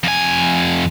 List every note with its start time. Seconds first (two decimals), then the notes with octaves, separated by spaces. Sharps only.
0.04 F2 G#5